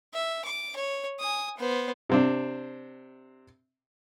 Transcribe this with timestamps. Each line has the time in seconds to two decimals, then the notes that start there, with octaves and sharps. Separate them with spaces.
0.14 E5
0.45 D6
0.76 C#5
1.19 G#5 D#6
1.57 B3 C5
2.09 C3 C4 D4